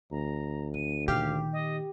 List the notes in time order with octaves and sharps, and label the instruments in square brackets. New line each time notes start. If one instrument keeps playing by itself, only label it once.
[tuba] D2 [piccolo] A#5
[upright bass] D3 [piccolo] D#7
[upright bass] A#2 D#3 [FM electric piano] G4 [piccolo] F5
[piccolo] D#5